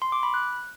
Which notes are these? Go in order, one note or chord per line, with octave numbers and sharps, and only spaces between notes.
C6
D6
B5
F#6